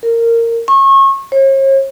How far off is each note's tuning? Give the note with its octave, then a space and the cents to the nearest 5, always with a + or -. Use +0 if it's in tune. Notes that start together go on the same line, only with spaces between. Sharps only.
A#4 -15
C#6 -30
C#5 -45